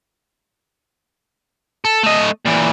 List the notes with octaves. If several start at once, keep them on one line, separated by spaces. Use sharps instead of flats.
A4
A3 D#5
A#2 E3